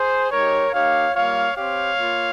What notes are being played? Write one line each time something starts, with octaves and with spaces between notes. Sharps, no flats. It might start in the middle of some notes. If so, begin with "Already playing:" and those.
Already playing: G#4 C5
G#3 D#4 G4 A#4 C#5
A#3 D#4 G4 C#5 F5
G3 A#3 F4 C#5 F5
C4 G4 C#5 F5
A#3 F4